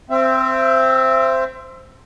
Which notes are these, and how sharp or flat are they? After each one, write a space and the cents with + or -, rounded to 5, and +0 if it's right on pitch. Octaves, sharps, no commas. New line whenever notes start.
C4 +0 E5 +30